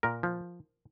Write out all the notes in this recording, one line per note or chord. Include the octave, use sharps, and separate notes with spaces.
A#2 A#4
F3